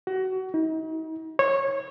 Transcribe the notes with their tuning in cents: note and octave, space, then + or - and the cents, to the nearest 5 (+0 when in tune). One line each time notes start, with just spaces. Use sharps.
F#4 +25
D#4 +40
C#5 -20